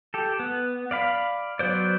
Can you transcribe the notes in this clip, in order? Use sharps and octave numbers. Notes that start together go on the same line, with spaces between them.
G4 A4
B3
D5 F5 B5
F#3 B3 C5 D5